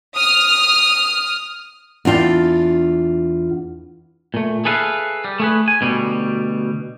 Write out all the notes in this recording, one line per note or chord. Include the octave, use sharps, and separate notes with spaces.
D#6 F6
E2 D4 F4 G5
A#2 A3
G#4 A4 B4 E5 F5
G3
A3 G#4 B4
G#5
D2 B2 G3